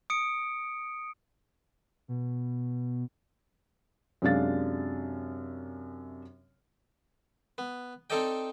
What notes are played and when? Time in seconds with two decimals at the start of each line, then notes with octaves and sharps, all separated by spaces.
0.10 D#6 C#7 D7
2.08 B2
4.22 F#2 C3 G#3 D4 F5 A6
7.58 B3
8.10 C4 D#4 A4 D5 D#5 G5